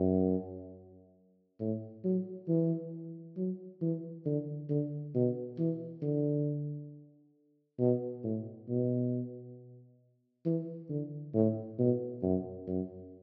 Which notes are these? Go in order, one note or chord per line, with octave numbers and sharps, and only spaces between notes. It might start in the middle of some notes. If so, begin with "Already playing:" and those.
Already playing: F#2
A2
F#3
E3
F#3
E3
D3
D3
B2
E3
D3
B2
A2
B2
E3
D3
A2
B2
F#2
F#2